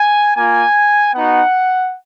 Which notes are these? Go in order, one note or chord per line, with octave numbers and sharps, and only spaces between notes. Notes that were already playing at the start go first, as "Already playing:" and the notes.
Already playing: G#5
A#3 F4 G#5
B3 D#4 F#4 F#5